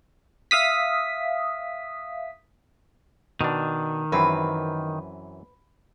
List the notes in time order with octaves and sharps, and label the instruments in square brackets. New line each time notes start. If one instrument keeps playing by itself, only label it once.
[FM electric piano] E5 F5 D#6 B6
[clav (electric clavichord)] B2 D4 [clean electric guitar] D#3
[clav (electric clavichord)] F#2 E3 C4 [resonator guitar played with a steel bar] B4